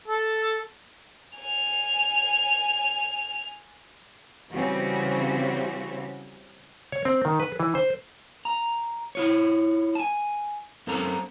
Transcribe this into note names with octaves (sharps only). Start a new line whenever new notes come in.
A4
G#5 F7
C#3 E3 G3 C4 F#4 G4
C#5
C4
D#3
B4
E3
C5
A#5
E4 F4 C#5
G#5 A5
F#2 A#3 C4 A4 A#5